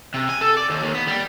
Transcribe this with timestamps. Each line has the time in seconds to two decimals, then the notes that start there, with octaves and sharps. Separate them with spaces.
0.14 C3
0.29 G#5
0.41 A4
0.57 D5
0.70 D#2
0.83 D#2
0.95 B3
1.08 G3